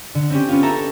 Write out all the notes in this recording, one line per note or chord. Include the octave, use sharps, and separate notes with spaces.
D3
C4 C#4 G4
B3 C#4 F4
A4 E5 A5 A#5